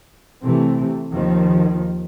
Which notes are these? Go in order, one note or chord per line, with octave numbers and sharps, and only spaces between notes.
C3 E3 A3 C4
D#2 D#3 F3